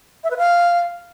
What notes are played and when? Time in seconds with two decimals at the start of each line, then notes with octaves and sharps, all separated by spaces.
0.24 E5
0.30 B4
0.37 F5